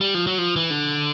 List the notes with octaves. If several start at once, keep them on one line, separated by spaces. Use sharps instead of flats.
G3
F3
F#3
F3
E3
D3